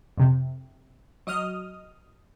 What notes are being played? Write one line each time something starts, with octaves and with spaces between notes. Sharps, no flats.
F2 C3
F#3 D#5 D#6 F6